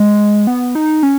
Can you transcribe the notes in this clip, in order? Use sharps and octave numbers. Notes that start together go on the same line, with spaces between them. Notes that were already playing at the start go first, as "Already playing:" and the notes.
Already playing: G#3
B3
D#4
C#4